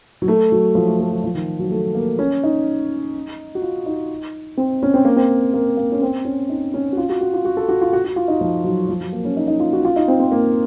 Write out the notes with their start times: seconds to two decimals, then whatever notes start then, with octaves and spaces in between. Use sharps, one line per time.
0.22 F#3
0.28 A3
0.52 F#3
0.75 F3
0.87 A3
1.00 A3
1.11 F#3
1.24 F3
1.35 D#3
1.59 F#3
1.71 A3
1.95 A#3
2.19 C#4
2.44 D#4
3.55 F#4
3.62 F4
3.86 D#4
4.57 C4
4.83 C#4
4.94 C4
5.05 A#3
5.16 C4
5.54 A#3
5.77 A#3
5.92 C#4
6.02 C4
6.25 C#4
6.49 D#4
6.74 C#4
6.93 F#4
6.98 F4
7.09 F#4
7.21 F#4
7.34 F4
7.45 F#4
7.57 A4
7.69 F#4
7.81 F4
7.93 F#4
8.04 F#4
8.16 F4
8.28 D#4
8.41 F3
8.64 F#3
8.89 F3
9.01 F#3
9.13 A#3
9.25 C#4
9.37 D#4
9.48 D#4
9.60 F4
9.73 F#4
9.85 F4
9.96 D#4
10.08 C4
10.20 C4
10.32 A#3